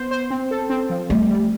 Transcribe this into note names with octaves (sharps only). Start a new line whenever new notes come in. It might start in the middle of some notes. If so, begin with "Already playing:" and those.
Already playing: B3 C5
C5
C4
A4
C4
F3
G3 A3
G3